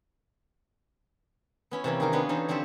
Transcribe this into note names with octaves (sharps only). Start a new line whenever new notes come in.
B3 C#4 E4
C3 E3 A#3 C#4
D#3 D#4 G#4 A#4
F3 B3 C#4 D4 B4 C#5
E3 C#4 D#4 A4 C5
D3 F3 C4 G4 A4